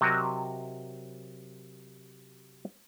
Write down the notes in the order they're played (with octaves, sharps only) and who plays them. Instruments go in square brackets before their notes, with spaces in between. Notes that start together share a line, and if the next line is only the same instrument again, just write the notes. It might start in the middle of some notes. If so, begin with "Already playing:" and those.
[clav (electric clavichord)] C3 F#3 C4 F#4 A#4 D#5